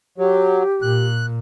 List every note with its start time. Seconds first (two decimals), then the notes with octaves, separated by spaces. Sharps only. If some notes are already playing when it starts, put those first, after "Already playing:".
0.18 F#3 G4
0.82 A#2 F#6